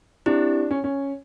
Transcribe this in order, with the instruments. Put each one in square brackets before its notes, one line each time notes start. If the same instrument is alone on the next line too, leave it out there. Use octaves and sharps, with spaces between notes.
[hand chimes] C4 E4 G4 [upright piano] D4
[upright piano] C#4
C#4